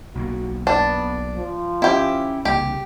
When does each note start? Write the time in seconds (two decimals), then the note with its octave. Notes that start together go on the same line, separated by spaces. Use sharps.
0.15 B1 B2 A#3 F#4
0.67 B3 D4
1.36 F3
1.82 C4 C#4 E4 G4
2.45 C2 C#3 A#3 G4